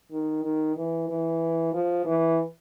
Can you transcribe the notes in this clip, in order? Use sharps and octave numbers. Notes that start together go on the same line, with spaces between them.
D#3
D#3
E3
E3
F3
E3